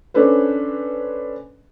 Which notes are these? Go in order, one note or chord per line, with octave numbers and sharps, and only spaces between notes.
C#4 D4 A4 B4 C5